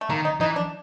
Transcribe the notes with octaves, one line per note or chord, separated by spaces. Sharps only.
A3
D#3 A#3
D#4
E3 D#4
D4